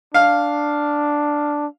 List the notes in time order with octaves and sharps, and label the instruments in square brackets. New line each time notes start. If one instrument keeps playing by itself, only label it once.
[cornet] D4 [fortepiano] F5